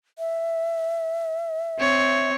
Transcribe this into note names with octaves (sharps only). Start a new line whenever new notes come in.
E5
C4 C#5